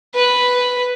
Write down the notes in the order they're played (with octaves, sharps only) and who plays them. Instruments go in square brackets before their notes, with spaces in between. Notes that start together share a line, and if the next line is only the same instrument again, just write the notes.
[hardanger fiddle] B4